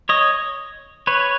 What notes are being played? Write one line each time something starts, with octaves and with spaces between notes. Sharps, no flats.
C#5 D#5
B4 C#5